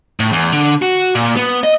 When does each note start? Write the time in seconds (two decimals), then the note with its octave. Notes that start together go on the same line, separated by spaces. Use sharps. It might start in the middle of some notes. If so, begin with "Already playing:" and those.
0.20 A2
0.32 E2
0.52 D3
0.82 F#4
1.15 A#2
1.37 B3
1.63 D#5